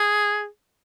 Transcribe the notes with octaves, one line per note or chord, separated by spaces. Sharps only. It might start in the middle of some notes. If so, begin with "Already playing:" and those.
Already playing: G#4